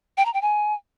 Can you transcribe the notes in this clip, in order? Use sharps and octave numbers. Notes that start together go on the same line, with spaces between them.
G5
A#5
G5
G#5